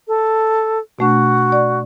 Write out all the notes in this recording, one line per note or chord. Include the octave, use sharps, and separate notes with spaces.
A4
B2 A3 D4 F#4
D5